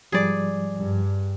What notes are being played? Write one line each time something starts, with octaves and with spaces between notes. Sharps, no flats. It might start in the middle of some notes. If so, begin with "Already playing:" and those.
G#2 F3 G3 G#4 D5
G2